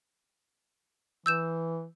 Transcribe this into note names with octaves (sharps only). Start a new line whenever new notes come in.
E3 E6 G6 E7